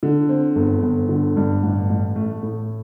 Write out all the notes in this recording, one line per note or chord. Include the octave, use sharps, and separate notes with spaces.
D3
C4
G1
G1
D3
G2
A1
A1
A3
A2